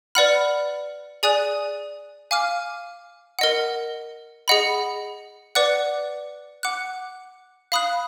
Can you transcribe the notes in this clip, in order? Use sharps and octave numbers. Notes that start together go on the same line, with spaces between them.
B4 D5 F#5 B5 F6
G#4 D5 G#5 D#6 F#6
F5 G#5 D6 F6
A#4 D#5 F#5
G#4 D#5 F#5 B5
B4 D5 F#5 D6 F#6
F#5 D6 F#6
F5 B5 D#6 F#6